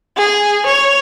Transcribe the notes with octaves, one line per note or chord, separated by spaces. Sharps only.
G#4
C#5